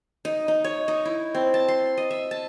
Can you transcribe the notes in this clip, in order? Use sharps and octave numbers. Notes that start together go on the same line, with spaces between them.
D#4
D#4
C#5
D#4
E4
C4
A5
C6
D#5
E5
A5